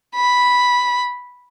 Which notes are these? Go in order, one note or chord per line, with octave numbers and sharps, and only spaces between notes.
B5